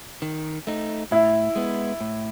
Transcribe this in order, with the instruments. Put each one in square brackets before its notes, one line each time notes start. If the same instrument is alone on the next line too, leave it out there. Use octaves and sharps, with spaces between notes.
[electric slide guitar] D#3
A3 D#4
[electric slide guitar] A2 [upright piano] E4
[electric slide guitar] G#3 B3
A2